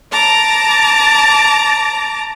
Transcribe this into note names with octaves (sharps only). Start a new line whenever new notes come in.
A5 A#5 D6